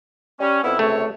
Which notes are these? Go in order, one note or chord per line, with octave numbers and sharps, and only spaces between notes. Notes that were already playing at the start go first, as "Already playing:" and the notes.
G3 C#4
F2 B3 E4
C#2 C3 A3 C#5